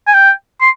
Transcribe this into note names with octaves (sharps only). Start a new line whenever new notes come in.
G#5
G5
C6